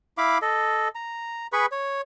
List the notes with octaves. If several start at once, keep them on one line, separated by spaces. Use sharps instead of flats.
E4 F5 B5 D6
A4 D#5
A#5
G#4 B4 B5 C#6
C#5